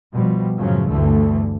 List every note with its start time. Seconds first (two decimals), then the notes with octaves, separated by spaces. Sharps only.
0.15 B2 F3 G3
0.57 F#2 A2 C#3 F3 F#3
0.90 G1 D2 G2 D3 E3 A3